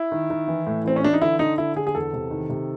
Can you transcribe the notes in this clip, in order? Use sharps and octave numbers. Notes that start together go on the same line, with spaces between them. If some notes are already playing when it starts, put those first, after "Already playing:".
Already playing: E4
D#3
D#3
E3
A2
E3 C4
C#4
E3 D4
D#4
D3 E4
D3 D#4
D3 E4
D3 G#4
G#4
E2 A4
C3
D#3
C3